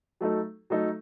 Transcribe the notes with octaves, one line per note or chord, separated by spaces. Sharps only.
F#3 A3 D#4 A4
F#3 A3 D#4 A4